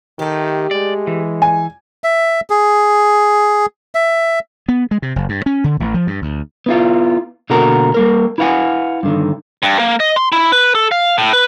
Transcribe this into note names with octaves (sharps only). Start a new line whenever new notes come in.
D#3 A3 G4
G#3 D5
E3
G#5
E5
G#4
E5
B3
G#3
C3
F#1
G2
C#4
D3
A1
F3
G2
D2
B3 E4 F4
B2 D3 A#3 F#4 A#4
G3 A#3 A#4
E4 B4 F5 F#5 G#5
G2 D3 D#3
G2
A#3
D#5
C6
E4
B4
A4
F5
A2
B4